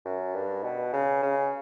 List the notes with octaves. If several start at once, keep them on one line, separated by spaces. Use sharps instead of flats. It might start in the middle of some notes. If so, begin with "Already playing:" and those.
F#2
G2
B2
C#3
C#3